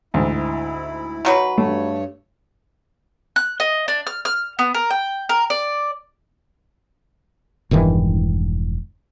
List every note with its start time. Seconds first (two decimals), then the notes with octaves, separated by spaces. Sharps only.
0.14 D2 G#2 E4
1.25 D#3 F#3 B4
1.58 G2 A3 C#5
3.36 F#6
3.60 D#5
3.88 D4
4.07 F6
4.25 F6
4.59 B3
4.74 A#4
4.90 G5
5.29 A#4
5.50 D5
7.71 E1 G2 D#3 E3